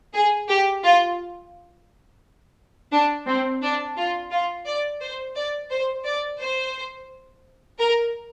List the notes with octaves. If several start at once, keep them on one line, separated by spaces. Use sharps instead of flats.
G#4
G4
F4
D4
C4
D4
F4
F4
D5
C5
D5
C5
D5
C5
A#4